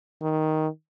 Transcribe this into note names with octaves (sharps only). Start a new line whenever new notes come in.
D#3